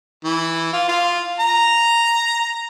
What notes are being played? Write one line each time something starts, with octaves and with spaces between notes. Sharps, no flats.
E3
F4
F4
A#5